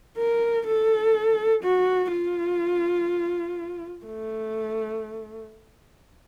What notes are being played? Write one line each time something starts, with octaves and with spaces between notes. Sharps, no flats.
A#4
A4
F#4
F4
A3